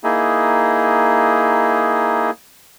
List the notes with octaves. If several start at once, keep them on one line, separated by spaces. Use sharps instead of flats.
A#3 D#4 E4 G#4